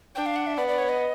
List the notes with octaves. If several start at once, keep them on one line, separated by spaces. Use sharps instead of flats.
D4 G5
F5
F#5
E5
B3 D5
D5
C#5
D#5